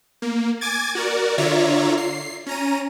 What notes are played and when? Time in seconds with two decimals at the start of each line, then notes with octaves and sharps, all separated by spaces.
0.22 A#3
0.61 G#5 D6 G#6 A6
0.95 F#4 A#4 D5
1.38 D3 F4 C#5 D5 E5 A#5
1.98 C7
2.46 C#4 A#5 D#7